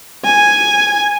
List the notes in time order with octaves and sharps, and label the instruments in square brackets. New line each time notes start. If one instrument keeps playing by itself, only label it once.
[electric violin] G#5